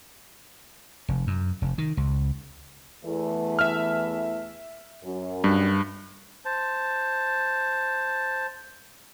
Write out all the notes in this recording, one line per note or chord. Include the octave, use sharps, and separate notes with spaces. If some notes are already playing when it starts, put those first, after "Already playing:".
F1
F#2
F1
D#3
C#2
E2 E3 A3
E5 F6
F#2
G2
C5 A5